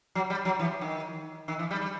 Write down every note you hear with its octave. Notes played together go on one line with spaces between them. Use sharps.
F#3
G3
F#3
E3
D#3
D#3
E3
G3
G3